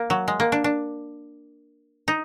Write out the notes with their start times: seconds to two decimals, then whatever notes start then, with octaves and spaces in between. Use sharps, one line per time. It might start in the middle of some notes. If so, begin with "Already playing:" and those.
Already playing: A#3
0.10 F#3
0.28 G#3
0.40 A#3
0.52 D4
0.64 D4
2.08 D#4